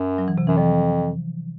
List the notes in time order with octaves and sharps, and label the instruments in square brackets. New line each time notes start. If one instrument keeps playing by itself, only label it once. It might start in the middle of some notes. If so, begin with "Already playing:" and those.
Already playing: [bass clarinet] F#2
[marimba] F#3
E3
C3
[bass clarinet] F#2 [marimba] E3
[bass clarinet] F2 [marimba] F3